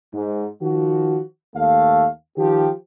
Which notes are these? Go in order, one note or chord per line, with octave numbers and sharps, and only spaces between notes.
G#2
D#3 F3 F#4
D#2 A3 F5
D#3 F3 G4